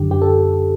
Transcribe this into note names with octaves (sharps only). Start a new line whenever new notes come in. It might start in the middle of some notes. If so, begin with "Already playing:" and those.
Already playing: F#2 D3 G4
G4
A4